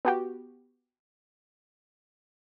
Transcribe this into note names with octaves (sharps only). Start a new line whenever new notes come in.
B3 F#4 G4